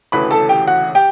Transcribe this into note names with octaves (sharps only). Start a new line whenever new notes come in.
E1 D2 C#3 E3 A3 B4 B5
A4 A5
G4 G5
F#4 F#5
G4 G5